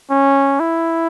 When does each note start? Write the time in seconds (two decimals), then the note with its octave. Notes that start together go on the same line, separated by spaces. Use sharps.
0.10 C#4
0.60 E4